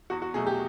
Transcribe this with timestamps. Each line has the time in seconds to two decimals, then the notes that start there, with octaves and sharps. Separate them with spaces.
0.10 E2 F#4
0.22 F#4
0.34 B2 F#3 A3 G#4
0.47 G4